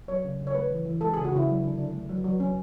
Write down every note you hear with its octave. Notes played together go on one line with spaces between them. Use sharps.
F#3 C#5
C#3
C#3
C#5
A3 B4
E3
E3
G#3 A4
C#3 G#4
F#4
C#3 E4
F#3
D3
D3
A3
F#3
F#3
F#3 C#4